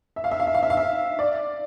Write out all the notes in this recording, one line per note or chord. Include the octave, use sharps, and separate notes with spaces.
E5
F5
E5
F5
E5
F5
E5
F5
E5
D5